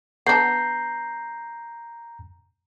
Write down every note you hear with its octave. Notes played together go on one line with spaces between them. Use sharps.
B3 D4 A#5 G6 C7